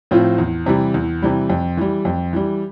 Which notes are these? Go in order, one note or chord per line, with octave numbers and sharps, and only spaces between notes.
A2 F3 C4 F4
E2
C3 E3 G3
E2
C3 E3 G3
F2
E3 G3
F2
E3 G3